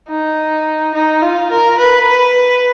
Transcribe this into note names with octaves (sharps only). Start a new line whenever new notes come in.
D#4
D#4
F4
A#4
B4
B4